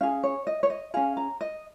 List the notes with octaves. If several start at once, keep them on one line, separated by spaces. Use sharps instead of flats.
C#4 G#4 F5
C#5
D#5
C#5
D#5
C#4 G#4 F5
A#5
D#5